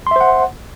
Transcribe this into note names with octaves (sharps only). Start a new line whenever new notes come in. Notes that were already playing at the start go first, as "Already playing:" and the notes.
C5 E5 F#5 C6